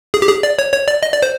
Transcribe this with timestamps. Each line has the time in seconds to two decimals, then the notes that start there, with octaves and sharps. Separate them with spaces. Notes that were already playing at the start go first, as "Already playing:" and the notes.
0.14 G#4
0.22 G4
0.29 G#4
0.43 D5
0.59 C#5
0.73 C#5
0.88 D5
1.03 D#5
1.13 D5
1.22 C5